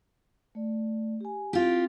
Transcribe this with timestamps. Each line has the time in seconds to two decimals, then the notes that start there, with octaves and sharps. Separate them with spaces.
0.55 A3 D5
1.21 G4 G#5
1.53 C4 E4 F4 G4